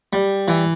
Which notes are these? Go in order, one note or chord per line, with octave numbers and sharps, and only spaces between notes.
G3
E3